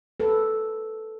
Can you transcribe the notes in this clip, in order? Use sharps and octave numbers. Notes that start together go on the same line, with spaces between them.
A4 B4